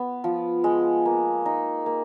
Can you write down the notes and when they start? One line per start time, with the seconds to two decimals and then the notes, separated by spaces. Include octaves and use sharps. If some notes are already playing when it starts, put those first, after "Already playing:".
Already playing: B3
0.24 F3
0.64 G#3
1.05 A#3
1.46 D#4
1.86 A#3